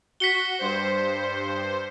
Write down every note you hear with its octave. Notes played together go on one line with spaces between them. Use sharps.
F#4 B6 C#7 G7
G2 C5